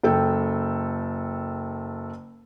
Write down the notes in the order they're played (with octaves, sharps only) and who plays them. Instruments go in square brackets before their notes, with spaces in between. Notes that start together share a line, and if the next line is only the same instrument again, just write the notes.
[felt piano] F#1 A4 G5